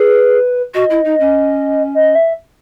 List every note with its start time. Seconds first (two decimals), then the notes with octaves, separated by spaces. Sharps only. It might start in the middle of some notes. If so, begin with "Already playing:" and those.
Already playing: G#4 B4
0.74 F#4 D#5
0.90 E4
1.05 D#4
1.20 C#4
1.95 D#5
2.15 E5